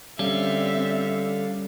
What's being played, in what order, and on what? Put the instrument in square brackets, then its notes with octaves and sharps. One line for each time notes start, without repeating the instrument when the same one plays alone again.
[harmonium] D3 A4 F5 [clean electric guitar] G3 C#4 [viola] C4 E5